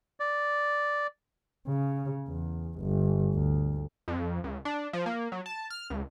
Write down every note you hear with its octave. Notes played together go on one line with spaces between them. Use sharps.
D5
C#3
E2
G1
D2
F2
C#2
D4
F3
A#3
F#3
A5
F6
C#2